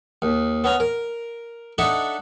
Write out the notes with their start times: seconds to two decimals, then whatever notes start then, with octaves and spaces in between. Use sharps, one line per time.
0.22 D#2
0.64 B3 C#4 A#5
0.80 A#4
1.78 D4 D#4 A4 E5 F#5